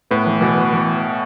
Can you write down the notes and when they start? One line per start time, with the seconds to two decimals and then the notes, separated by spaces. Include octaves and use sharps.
0.11 A2 B3
0.27 E3
0.41 B2 E3
0.57 B3
0.73 E3